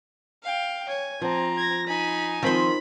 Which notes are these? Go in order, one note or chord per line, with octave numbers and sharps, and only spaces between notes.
F5 G5
C#5 G#5
F3 C4 A#5
G#6 A#6
D#4 G#5 B5
D#3 F3 C4 C5 B5